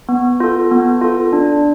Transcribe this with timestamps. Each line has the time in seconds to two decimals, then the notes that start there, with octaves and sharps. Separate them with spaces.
0.09 B3
0.40 F4 A4
0.71 B3
1.01 F4 A4
1.33 D4